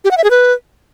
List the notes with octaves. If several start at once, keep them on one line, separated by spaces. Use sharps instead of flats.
G4
F#5
E5
G#4
B4